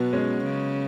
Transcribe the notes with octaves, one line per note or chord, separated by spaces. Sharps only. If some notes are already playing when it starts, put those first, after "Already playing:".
Already playing: B2 F#3 B3
G#3 C#4
C#3